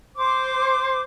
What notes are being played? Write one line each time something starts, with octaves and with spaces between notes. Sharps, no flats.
C5 D6